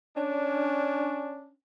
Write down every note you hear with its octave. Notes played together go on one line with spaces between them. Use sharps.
C#4 D4